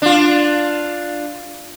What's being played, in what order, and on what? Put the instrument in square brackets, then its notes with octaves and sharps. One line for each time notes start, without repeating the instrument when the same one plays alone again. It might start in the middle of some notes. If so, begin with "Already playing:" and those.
[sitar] D4 F4